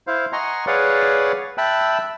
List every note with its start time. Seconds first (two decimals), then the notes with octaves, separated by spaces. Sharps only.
0.07 E4 C5 F5
0.33 D#5 F#5 G#5 A#5 C6 C#6
0.67 G#4 B4 C#5 D5 F5 F#5
1.58 E5 G5 A5 B5 E6 F#6